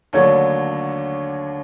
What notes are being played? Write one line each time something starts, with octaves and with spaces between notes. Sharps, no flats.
D#2 D3 F#3 A3 D4 C#5